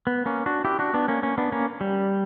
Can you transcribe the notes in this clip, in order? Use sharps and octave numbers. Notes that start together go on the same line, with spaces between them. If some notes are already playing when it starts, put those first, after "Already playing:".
B3
A#3 C#4
D4 F#4
E4 G4
D4 F#4
B3 D4
A#3 C#4
A#3 C#4
B3 D4
A#3 C#4
G3